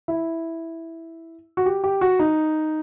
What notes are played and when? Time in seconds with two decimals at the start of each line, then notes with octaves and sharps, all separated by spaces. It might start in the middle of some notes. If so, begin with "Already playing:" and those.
0.08 E4
1.57 F#4
1.66 G4
1.84 G4
2.01 F#4
2.19 D#4